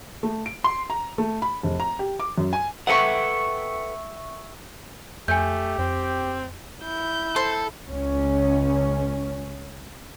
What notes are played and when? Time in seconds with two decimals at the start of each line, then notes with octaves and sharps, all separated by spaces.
0.23 A3
0.46 D7
0.64 C6
0.90 A#5
1.18 A3
1.42 B5
1.63 F1
1.80 A#5
1.99 G4
2.20 D6
2.38 F#2
2.53 G#5
2.87 A4 B4 E5 F#5 G5 C#6
5.28 F2 A3 G4 G#5 G6
5.79 F2 C4
6.83 E4 G6
7.36 A4 C5
7.88 C#2 C#4